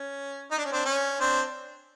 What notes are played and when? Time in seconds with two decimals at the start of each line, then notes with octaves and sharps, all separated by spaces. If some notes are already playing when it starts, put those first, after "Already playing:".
Already playing: C#4
0.51 D#4
0.58 D4
0.65 C#4
0.72 C4 D4
0.85 C#4
1.20 C4 D4